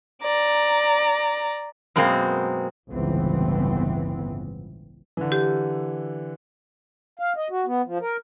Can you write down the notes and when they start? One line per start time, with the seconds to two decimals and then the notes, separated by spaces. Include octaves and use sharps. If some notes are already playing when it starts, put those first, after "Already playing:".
0.23 D5 A#5
1.96 F#2 B2 G#3 A#3 C4
2.89 G1 C#2 A2 E3 B3 C4
5.17 D3 E3
5.32 G4
7.19 F5
7.36 D#5
7.50 F#4
7.66 B3
7.85 F3
8.01 A#4